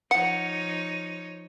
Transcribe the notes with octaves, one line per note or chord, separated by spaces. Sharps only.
F3 D#4 C#5 F#5 C#7